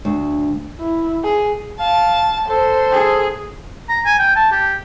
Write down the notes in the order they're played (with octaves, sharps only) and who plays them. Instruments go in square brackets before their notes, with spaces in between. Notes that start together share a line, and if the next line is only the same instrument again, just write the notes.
[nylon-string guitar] D2
[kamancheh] E4
G#4
[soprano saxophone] F5 [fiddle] A5
[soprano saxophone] A4 [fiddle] C5
[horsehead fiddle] G#4
[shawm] A#5
G#5
G5
A5
G4